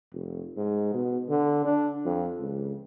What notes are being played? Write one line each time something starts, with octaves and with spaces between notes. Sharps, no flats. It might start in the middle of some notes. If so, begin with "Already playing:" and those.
F1
G#2
B2
D3
D4
F2
C#2